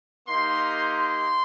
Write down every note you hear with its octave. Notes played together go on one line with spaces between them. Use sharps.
A#3 D#4 G4 C6
C6